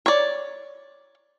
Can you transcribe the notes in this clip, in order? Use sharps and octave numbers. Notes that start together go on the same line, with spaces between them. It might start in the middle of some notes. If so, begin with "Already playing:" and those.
C#5 D5